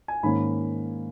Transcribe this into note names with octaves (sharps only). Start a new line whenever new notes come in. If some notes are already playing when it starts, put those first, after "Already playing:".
G#5
G#2 D#3 A#3 C#4 B5